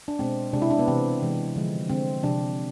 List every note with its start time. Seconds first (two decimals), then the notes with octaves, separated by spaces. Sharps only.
0.08 D4
0.19 B2 G#3 C4
0.53 C3 G#3 D4
0.62 E4
0.70 D4
0.79 B3
0.87 C3 E3 G#3 C4
1.22 C3 E3 G#3
1.56 D3 F3 G#3
1.89 D3 G#3 C4
2.22 C3 F3 G#3 D4